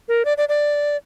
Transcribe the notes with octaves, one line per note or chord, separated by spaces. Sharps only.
A#4
D5
D5
D5